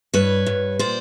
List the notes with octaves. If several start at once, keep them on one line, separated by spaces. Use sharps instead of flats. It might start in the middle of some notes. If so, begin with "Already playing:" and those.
G2 B4 C#5
G2
A#2 C5 D5